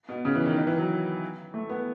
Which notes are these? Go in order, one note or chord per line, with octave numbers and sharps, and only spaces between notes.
B2
C#3
E3
D#3
D#3
E3
F#3
A3
B3